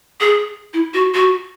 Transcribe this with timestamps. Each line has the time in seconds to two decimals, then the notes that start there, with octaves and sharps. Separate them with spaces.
0.21 G#4
0.74 E4
0.94 F#4
1.14 F#4